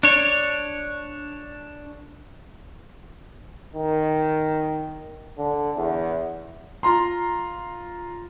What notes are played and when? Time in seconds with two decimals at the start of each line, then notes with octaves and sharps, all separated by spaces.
0.03 D4 C#5
3.75 D#3
5.38 D3
5.76 E2
6.83 F4 A#5 C6